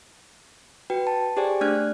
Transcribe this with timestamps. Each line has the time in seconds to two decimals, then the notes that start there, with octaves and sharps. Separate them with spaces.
0.90 F#4 B4 G5
1.07 A5
1.37 G4 G#4 C5 D5 G5 G#5
1.61 A3 D4 D5 F6 F#6 G#6